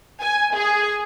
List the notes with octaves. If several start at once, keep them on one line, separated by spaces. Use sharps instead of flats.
G#5
G#4